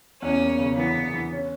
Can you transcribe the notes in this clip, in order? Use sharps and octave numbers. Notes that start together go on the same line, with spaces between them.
E2 C#4
A#3
C#3
E3 B3
E2
E3
C#4